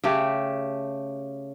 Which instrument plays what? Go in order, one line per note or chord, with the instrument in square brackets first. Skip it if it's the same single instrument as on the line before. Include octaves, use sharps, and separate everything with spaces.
[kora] C#3 A3 G4